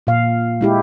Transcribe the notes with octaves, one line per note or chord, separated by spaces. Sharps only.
A#2 F5
G#3 E4 G4